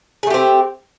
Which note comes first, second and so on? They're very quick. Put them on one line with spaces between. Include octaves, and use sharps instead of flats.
G#4 A3 G4 C4